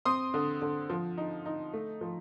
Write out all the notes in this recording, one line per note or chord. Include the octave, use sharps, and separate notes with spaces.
C4 C6 D#6
D3
D3
F3
D#4
D#4
A3
F3